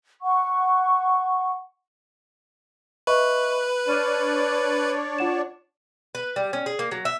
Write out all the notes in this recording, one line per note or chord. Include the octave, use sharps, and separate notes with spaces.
F#5 C#6
B4 D#5 E5 C#6
D4 C#5 D5 F6 D#7
F4 F#5 E7
B4
G3
C#4
G#4
A#3
F#3
E5